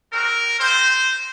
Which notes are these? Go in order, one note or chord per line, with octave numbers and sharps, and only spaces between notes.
G#3 C4 F#4 A#4
G#3 C4 F4 C5